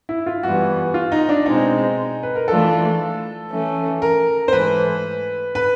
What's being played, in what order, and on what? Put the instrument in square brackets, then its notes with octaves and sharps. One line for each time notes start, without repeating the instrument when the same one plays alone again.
[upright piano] E4
F4
[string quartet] G2 E3 G3 B3 [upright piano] F#4
[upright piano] F4
D#4
D4
[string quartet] B2 G#3 C4 [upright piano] D#4
[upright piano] B4
A#4
[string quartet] E3 A3 D4 F4 [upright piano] A4
[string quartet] E3 A3 C#4
[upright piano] A#4
C5
[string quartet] G#2 E3 A3 [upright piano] B4
[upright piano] B4